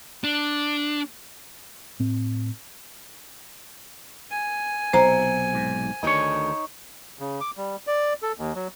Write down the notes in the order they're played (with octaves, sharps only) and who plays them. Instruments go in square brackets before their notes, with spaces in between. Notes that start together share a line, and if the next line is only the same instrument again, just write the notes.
[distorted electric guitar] D4
[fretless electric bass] A2 C4
[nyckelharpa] G#5
[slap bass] B1 C3 [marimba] C5 A#5
[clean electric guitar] G#2
[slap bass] D2 D#3 [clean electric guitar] D#4 C#5
[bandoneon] C#3
D6
G3
D5
A4
D#2
F#3